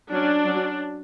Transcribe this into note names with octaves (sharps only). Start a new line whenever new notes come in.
F#3 C#4 D4
F#3 C#4